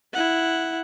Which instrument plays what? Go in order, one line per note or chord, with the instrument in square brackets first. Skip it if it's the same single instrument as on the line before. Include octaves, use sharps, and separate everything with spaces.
[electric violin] E4 F#5